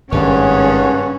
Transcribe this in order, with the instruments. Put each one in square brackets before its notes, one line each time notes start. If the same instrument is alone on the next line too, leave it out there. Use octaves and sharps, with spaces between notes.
[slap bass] G#1 [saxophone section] G2 C#3 A#3 [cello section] C#4 [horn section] G#4 C#5 F#5